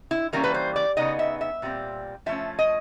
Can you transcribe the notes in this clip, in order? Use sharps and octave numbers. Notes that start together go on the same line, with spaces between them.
E4
E3 G3 A#3 C#4 A#4
B4
C5
D5
C#3 F#3 B3 D#4 D#5
E5
E5
A#2 G3 C4
F3 A3 C#4 E5
D#5